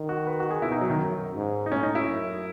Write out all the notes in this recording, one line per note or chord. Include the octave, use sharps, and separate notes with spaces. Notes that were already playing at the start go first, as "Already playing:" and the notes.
Already playing: D#3
F#4
B4
F#4
G#4
B2 E4
D#4
F#3
D#3
F#2
G#2
D#4
A2 C#4
D#4
E4
F#2